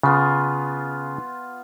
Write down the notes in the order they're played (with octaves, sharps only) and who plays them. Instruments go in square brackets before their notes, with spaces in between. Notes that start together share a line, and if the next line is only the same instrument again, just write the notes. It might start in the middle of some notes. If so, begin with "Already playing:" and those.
[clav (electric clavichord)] C#3 [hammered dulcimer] B3 F4